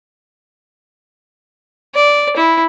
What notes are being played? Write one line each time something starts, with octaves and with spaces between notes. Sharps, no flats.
D5
E4